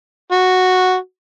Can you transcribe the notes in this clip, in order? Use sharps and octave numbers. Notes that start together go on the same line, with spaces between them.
F#4